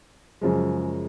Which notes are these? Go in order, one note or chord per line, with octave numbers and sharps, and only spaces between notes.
F#2 C#3 F3 G#3